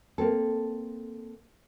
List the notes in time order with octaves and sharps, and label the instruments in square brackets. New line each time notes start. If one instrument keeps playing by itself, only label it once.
[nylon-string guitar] A#3 C4 A4